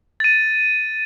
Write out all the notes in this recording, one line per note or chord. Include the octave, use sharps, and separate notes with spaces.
A6 D#7